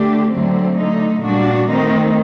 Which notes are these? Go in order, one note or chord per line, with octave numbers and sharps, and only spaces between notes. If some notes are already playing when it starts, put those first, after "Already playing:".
Already playing: D3 A3 D4 G4
D2 D3 F#3 A3 C4
D3 A3 D#4
A#2 G3 D4 F#4
D#3 A3 C4 D#4